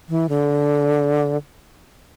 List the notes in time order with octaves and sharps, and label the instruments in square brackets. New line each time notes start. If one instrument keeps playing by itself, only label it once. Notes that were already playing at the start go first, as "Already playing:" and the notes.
[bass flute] E3
D3